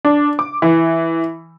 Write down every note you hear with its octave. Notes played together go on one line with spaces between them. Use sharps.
D4
D6
E3